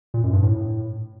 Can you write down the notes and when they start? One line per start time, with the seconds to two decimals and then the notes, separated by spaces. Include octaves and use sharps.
0.14 A#2
0.23 F#2
0.33 G2
0.42 A2